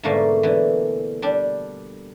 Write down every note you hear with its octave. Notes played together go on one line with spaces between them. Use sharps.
G#2 B2 D3 A3 A#3
D3 E3
G3 D4